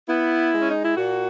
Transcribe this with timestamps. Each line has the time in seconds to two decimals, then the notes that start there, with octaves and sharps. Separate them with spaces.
0.08 B3 E4
0.53 G#3
0.59 C#4
0.71 D#4
0.84 E4
0.96 A#2 F#4